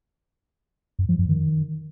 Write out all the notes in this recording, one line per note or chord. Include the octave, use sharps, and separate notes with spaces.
F#2
F3
F#2
D#3